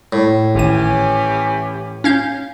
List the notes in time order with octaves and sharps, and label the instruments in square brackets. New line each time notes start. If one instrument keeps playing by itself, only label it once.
[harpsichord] A2
[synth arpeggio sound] G#1 D#7 [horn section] E3 C#4 G4
[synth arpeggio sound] C#4 F5 G6